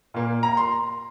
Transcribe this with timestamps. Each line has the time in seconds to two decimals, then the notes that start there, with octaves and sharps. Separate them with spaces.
0.14 A#2 A#3
0.43 A#5
0.57 C6